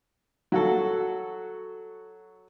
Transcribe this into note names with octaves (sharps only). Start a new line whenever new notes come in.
F#3 F#4 A4